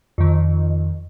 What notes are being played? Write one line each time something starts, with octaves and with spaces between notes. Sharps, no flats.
F2 D#3